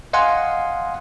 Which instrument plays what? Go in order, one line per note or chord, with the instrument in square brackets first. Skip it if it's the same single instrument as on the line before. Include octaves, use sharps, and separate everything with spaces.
[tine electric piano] D#5 F5 F#5 G#5 C6